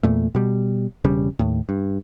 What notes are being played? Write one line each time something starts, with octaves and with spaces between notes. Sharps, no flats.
E2 A#2 A3
B2 G3
E1 C#3 G3
D#2 A2
G2